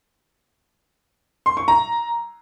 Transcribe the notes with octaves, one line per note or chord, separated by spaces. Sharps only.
C6
C#6
A#5